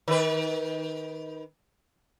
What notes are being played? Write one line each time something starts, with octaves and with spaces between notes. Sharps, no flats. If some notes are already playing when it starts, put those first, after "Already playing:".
D#3 B4